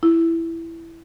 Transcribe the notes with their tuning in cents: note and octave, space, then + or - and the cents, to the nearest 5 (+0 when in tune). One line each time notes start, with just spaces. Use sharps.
E4 +10